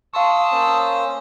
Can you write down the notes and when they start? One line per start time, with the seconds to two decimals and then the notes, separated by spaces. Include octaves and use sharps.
0.14 F5 A5 C6 C#6 D#6 E6
0.52 A#3 C#4 C5